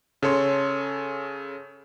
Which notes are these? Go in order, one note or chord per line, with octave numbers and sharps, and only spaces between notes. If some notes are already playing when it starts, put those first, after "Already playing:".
C#3 A4 C#5 C6